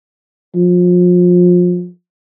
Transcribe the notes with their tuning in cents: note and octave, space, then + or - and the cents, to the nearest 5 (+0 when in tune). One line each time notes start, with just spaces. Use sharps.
F3 +30